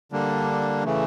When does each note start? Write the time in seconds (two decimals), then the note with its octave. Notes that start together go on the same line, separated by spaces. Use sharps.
0.12 D3 G3 A#3 D4
0.85 C#3 E3 A3